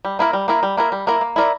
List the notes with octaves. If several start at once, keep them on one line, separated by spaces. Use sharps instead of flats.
G3
A#3 E4 A#4
G3
A#3 E4 A#4
G3
A#3 E4 A#4
G3
A#3 E4 A#4
A#3
E4 A#4 D5